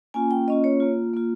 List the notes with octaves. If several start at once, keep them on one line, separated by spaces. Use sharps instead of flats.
A#3 C#4 F4 G#5
G5
A#3 C#4 F4 D#5
C#5
A#3 F4
A#3 F4